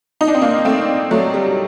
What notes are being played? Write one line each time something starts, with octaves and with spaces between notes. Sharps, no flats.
D#4
D4
C4
A#3 D4
A3 C4
F#3 A3
G3